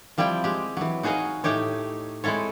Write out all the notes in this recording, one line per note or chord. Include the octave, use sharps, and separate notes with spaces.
F3 G3 C4 E4 G5
G#3 G4
E3 F#3
D#4 F#4 G#4 C#5 D#5 F5
A2 A3 D#4 G4 C#5
G#3 C4 E4 A4 C#5